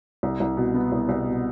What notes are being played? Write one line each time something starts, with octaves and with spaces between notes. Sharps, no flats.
C2
C2
B2
B3
C2
C2
B2